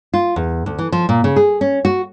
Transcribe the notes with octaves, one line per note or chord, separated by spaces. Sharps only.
F4
E2
D2
E3
F3
A#2
C#3
G#4
C#4
F#4